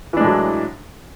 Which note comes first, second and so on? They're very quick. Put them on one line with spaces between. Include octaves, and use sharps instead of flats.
E3 D4 G#3 A2 F#3